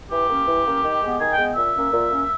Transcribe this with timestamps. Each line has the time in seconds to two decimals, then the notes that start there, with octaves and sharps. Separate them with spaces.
0.11 E3 G4
0.29 A#3 C#4
0.47 E3
0.66 A#3 C#4
0.83 D#3
1.02 G#3 B3
1.20 D#3 G#4
1.31 G5
1.38 G#3 B3
1.56 A#2 E5
1.75 A#3 C#4
1.93 A#2
2.11 A#3 C#4